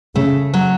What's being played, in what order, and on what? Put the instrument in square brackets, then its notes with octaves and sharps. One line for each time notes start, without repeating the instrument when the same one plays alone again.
[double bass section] C#3 [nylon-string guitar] A3
[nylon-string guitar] F#3